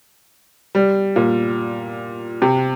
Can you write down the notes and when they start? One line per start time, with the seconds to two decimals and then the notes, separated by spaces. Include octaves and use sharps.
0.75 G3
1.16 A#2
2.42 C3